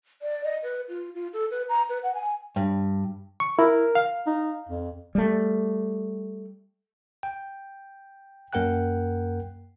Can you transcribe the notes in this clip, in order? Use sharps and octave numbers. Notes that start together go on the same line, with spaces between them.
D5
D#5
B4
F4
F4
A4
B4
A#5
B4
F#5
G#5
G2
C#6
E4 A#4
F5
D#4
F2
G3 A3
G5
F#2 A#3 A#4 F#5 G5 F#6